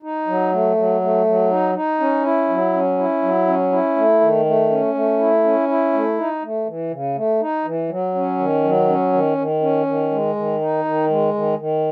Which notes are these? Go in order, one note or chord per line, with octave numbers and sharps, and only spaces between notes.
D#4
F#3
A3
F#3
A3
F#3
D#4
D#4
C#4
E4
F#3
C#4
E4
F#3
C#4
E4
A3
D#3
A3
C#4
A3
E4
C#4
E4
A3
D#4
A3
E3
C#3
A3
D#4
E3
F#3
C#4
D#3
F#3
C#4
D#3
D#3
C#4
D#3
G#3
D#3
D#4
D#3
G#3
D#3
D#3